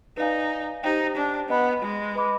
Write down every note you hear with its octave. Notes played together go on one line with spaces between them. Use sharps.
D#4 B4 D5 F5 G#5
D#4 G4 C5 G5
D4
B3 B4 D#5 B5
G#3
B4 D#5 B5 D6